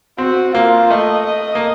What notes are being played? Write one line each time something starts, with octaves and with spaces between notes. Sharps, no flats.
C4 F#4
A#3 F4
A3 D#5
D#5
A#3